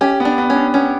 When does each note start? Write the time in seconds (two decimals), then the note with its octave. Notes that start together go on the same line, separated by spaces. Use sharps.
0.01 C#4 G4
0.20 B3
0.25 D4
0.38 B3
0.50 C#4
0.56 D4
0.74 B3 C#4